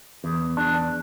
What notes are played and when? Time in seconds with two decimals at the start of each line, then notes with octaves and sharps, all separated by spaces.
0.24 E2
0.57 E2 D4